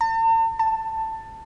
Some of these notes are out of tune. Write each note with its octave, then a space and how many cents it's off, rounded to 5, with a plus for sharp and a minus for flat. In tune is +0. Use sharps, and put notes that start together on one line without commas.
A5 +45
A5 +15